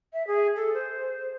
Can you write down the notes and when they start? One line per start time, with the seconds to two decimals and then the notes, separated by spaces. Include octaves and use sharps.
0.13 E5
0.27 G#4
0.56 A4
0.74 C5